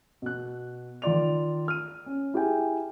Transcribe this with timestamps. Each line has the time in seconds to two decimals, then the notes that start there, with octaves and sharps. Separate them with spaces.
0.22 B2 F#6
1.02 D#3 F4 D5 F7
1.68 F6 D#7
2.06 C#4
2.34 E4 G4 G#4 G5 G#5